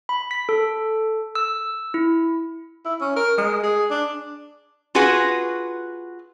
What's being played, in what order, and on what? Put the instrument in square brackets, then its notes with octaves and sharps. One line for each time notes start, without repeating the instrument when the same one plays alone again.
[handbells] B5
B6
A4
E6
E4
[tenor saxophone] E4
C#4
A#4
G#3
G#4
D4
[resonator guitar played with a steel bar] F4 F#4 G#4 B4 F#5